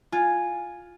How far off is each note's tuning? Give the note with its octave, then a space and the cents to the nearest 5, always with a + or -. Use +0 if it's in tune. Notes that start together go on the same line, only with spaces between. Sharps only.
F4 +5 G#5 +0